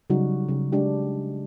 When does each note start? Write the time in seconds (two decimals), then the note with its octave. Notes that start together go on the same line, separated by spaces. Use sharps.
0.10 C#3 F#3 G3 D#4 F#4
0.49 C#3
0.72 G#3 D4 G4